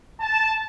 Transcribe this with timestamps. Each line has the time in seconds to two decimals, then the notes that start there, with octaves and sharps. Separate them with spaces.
0.20 A5